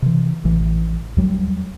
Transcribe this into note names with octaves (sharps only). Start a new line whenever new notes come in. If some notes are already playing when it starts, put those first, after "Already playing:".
C3 E3
A1 E3
D#2 F#3 G3